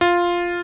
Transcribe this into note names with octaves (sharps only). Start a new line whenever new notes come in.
F4